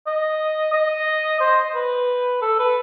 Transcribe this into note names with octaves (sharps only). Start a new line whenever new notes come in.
D#5
D#5
C5
B4
A4
B4